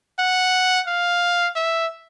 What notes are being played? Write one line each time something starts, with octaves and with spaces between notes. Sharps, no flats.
F#5
F5
E5